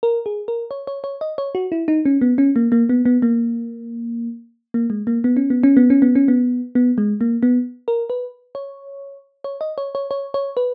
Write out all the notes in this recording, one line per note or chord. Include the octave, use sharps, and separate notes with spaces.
A#4
G#4
A#4
C#5
C#5
C#5
D#5
C#5
F#4
E4
D#4
C#4
B3
C#4
A#3
A#3
B3
B3
A#3
A#3
G#3
A#3
B3
C#4
B3
C#4
B3
C#4
B3
C#4
B3
B3
G#3
A#3
B3
A#4
B4
C#5
C#5
D#5
C#5
C#5
C#5
C#5
B4